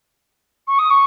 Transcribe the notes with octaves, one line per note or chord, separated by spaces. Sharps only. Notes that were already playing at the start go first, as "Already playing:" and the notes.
C#6
D#6
C#6